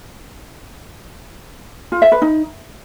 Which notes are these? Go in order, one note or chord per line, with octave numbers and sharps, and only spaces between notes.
F4
E5
B4
D#4